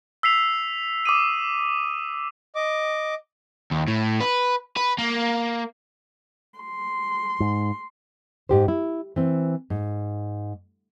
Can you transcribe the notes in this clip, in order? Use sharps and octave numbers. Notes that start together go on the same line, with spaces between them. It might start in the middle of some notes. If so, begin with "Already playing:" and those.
E6 B6 C7 F7
D6 D#6 D#7
D#5 D6
D#2
A2
B4
B4
A#3
C6
G#2
G#2 G4 C5
E4
E3 C4
G#2